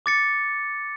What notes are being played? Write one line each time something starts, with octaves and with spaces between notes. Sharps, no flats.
D6 A6 C#7